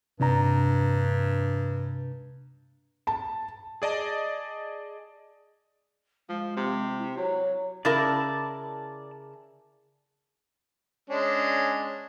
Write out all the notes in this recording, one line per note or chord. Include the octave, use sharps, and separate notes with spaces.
G2 C3 D4 A#5
A5
G#4 D5 D#5 A5
F3 G#3
C3
E4
F#3 C#5
C#3 E4 A#4 D5 A5
G#3 C#4 D4